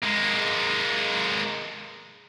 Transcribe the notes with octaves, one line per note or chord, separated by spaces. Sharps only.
G#3 A#3